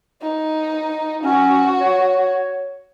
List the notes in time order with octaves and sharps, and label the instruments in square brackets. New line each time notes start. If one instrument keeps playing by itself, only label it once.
[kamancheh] D#4
[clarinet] C#4 [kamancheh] F#4
[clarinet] C#5